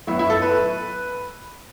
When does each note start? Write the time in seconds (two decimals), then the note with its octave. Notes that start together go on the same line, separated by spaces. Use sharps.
0.07 A2 F#3 B3 E4
0.19 E4
0.30 A4
0.42 B4